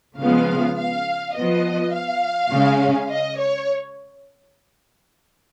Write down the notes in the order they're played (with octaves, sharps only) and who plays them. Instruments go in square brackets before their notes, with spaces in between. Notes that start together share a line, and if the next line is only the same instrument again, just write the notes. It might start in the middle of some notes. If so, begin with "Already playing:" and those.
[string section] C#3 F3 G#3 B3 F5
F5
F3 B3 D#5
F5
C#3 G#3 C#4
D#5
C#5